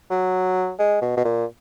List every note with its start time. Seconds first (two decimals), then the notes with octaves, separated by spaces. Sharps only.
0.10 F#3
0.79 G#3
1.02 B2
1.17 B2
1.24 A#2